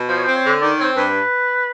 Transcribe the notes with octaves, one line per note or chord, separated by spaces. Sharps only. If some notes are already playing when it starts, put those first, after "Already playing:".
Already playing: B2
F3 C5
C#5
C5
C4
C#5
D3
D#3 D5
C4 C#5
G2 B4